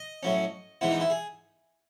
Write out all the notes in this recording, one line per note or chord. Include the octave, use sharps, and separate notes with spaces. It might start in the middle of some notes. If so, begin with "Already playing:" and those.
Already playing: D#5
A2 F#3 C#4
G#2 E3 B3 E4
D#4
E4
G#4